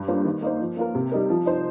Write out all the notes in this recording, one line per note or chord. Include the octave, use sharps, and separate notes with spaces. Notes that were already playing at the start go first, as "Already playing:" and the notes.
Already playing: G2
G3 A#3 F4 C5
D#3
A#3 D#4 C5
F3
A#3 F4 A#4
C3
G3 D#4 A#4
F3
D#4 C5